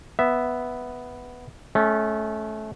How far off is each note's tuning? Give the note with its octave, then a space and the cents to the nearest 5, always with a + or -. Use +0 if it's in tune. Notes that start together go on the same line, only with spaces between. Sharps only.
B3 +0 E5 +0
A3 -25 C#4 +0